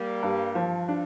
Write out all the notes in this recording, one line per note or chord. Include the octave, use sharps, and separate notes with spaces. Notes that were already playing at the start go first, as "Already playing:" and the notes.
Already playing: G3 A#3
G2
F3
D4